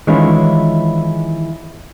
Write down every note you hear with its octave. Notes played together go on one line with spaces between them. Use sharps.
D#3 E3 G#3 C#4 E4 F4